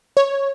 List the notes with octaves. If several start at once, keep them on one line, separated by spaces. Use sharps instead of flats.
C#5